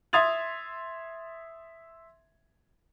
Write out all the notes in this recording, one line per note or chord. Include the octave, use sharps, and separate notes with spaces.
E5 C6 D#6 G#6 A6 F7